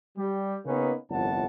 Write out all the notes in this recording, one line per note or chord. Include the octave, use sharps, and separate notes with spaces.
G3
C#3 A#3 B3 C#4 D#4 B4
G1 C2 F2 A2 F#5 A5